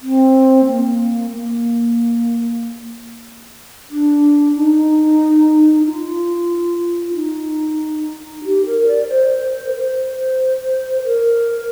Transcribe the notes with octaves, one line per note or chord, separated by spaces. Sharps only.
C4
A#3
A#3
D4
D#4
D#4
F4
D#4
G4
A#4
D5
C5
A#4
C5
A#4